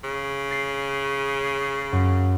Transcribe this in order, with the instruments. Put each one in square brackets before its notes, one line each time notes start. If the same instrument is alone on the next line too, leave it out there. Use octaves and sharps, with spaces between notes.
[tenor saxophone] C#3
[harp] A6 A#6 C7
F#2